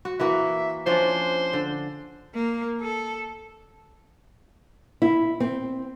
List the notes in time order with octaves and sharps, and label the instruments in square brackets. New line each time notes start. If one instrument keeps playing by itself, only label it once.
[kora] F#4
[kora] E3 A#3 F#4 [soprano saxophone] E5
[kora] F3 C#4 D4 [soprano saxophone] C5
[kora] D3
[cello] A#3
A4
[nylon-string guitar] E4
C4